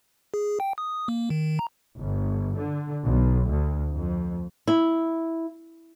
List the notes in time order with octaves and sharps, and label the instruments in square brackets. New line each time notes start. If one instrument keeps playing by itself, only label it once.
[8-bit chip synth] G#4
G5
D#6
A#3
D#3
A#5
[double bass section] G1
D3
B1
D2
F2
[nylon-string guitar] E4